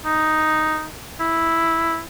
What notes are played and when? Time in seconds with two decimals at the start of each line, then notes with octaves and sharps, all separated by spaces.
0.05 D#4
1.20 E4